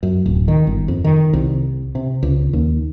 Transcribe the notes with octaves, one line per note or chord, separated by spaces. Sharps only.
F#2
D1
D#3
G1
F2
D#3
C2
C3
C#2
D#2